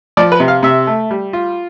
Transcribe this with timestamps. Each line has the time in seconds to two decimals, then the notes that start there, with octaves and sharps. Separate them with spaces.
0.17 F3 D5
0.32 B4
0.40 C3
0.48 F5
0.63 C3 E5
0.87 A3
1.11 G3
1.33 F4